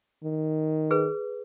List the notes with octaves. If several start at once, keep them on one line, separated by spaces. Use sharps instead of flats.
D#3
G#4 B4